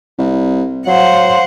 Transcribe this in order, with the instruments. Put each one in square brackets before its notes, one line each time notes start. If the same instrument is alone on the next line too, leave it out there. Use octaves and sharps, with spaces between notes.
[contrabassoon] C2
[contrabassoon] F#3 [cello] C5 F#5 [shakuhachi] F5